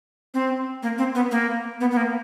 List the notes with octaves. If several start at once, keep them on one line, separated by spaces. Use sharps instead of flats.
C4
A#3
C4
B3
A#3
B3
B3
A#3